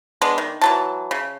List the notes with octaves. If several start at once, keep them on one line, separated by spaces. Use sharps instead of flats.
G#3 B3 D4
D#3
E3 F#3 A5
C#3